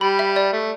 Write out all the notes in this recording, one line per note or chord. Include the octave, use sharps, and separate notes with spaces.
G3 B5
E5
D5
A3